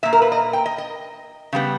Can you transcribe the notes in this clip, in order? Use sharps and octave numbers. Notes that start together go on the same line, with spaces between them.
A#2 A#3 E5
A#4
B4
D#5
G5
D#5
D#5
C#3 G3 B3